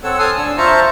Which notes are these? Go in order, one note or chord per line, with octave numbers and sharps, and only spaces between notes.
C4 A4 C#5 F#5 E6
G#5 A5 C6 D#6 F6
D4 E6
F4 C5 E5 A5 A#5 C#6